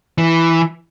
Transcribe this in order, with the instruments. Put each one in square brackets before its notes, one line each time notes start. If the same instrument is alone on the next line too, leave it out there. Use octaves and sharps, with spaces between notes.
[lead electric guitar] E3